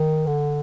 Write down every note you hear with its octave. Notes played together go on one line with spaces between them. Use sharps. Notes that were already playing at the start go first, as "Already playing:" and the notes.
Already playing: D#3
D3